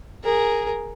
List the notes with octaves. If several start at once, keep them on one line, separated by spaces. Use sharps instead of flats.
G#4 A#4